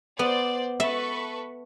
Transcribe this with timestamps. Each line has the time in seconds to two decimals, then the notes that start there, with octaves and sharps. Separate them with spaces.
0.19 B3 C5 D5
0.80 A4 B4 E5 C#6